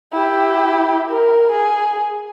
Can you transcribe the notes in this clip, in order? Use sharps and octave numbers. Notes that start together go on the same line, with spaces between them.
E4 G4
A#4
G#4